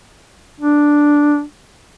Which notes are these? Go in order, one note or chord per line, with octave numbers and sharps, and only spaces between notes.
D4